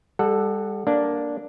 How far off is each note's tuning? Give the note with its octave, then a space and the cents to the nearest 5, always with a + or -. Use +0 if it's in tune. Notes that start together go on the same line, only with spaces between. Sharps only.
G3 +30 A4 +0 F#5 +0
A#3 +5 D4 -5